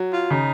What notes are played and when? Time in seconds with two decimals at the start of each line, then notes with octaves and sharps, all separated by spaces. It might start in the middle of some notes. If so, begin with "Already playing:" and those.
Already playing: F#3
0.13 F4
0.30 C#3 D#4